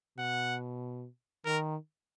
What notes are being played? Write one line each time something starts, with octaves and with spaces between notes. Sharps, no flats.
B2 F#5
D#3 A#4